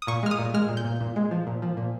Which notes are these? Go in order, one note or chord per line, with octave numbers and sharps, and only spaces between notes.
D#6
A#2 C#6
G#3 F6
D#6
A#2
G#3 F6
A#2
G6
A#2
A#2
G#3
F3
A#2
F3
A#2